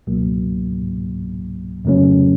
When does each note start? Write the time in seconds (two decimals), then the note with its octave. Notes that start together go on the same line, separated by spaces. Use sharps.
0.07 C#2 B2 F#3 A#3
1.85 F2 C#3 F#3 A3 C#4